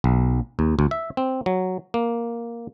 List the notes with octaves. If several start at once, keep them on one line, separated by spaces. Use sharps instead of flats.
B1
D#2
D2
E5
C4
F#3
A#3